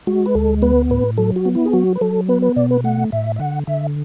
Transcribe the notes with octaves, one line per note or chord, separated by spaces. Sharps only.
G#3 F#4
B4
D2 A4
B3 B4
A2 B4
F#3 A4
F#4
B3
E4
G#4
F#3 F#4
B4
F#3 A4
B3 B4
B4
B2 D5
B4
A3 F#5
A2 E5
E5
D3 F#5
D3 E5